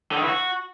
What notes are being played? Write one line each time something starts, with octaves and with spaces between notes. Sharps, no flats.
D3
D#3
E3
F#4